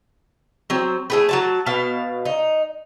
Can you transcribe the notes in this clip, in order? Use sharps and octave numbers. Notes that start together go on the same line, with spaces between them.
F#3 C4
A3 G#4 B4
F#3 F#4 A5
B2 F5 A5
D#4